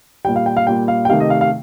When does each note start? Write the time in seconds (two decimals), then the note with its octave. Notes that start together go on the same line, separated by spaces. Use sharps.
0.25 G3 G5
0.29 A#2
0.36 F5
0.46 G5
0.57 F5
0.67 A#2 G3 G5
0.88 F5
1.05 G5
1.09 C3 D#3 A3 F5
1.20 D#5
1.30 F5
1.41 F5